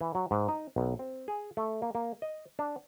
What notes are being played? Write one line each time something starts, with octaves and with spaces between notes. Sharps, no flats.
E3
F#3
G#2
D#4
B1
C4
G#4
A3
A#3
A#3
D#5
D4